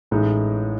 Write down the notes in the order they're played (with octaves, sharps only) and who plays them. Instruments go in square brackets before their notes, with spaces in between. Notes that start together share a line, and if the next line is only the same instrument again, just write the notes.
[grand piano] A1 A2 G#3 D#4